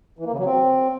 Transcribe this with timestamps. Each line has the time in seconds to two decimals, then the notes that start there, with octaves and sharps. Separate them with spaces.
0.19 E3
0.25 A#3
0.32 C#3
0.39 F#3
0.45 C4